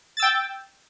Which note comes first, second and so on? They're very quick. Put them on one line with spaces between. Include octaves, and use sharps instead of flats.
A6 E6 G5